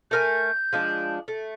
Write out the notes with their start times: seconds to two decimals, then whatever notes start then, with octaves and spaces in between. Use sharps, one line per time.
0.11 A3 A#4 G#5 G6
0.73 F3 G#3 D4
1.28 A3